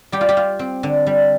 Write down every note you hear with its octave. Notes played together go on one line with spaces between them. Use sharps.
G3 G4
F4
G4
F4
C4
D3
G3